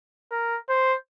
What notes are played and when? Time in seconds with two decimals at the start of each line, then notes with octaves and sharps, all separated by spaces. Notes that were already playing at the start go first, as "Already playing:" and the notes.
0.31 A#4
0.69 C5